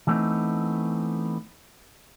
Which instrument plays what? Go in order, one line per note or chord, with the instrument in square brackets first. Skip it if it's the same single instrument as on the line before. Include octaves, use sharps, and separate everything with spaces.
[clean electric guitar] E3 G3 A3 B3 C4 D#4